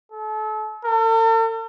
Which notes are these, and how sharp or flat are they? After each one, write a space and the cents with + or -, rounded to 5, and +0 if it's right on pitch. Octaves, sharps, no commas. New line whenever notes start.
A4 -35
A4 +45